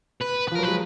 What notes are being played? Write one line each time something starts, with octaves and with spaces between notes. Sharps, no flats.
B4
B4
F3
A#4
F#3
G#3 B4